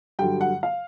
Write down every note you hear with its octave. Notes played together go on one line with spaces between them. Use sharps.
G2 D3 F#3 G5
F#5
F5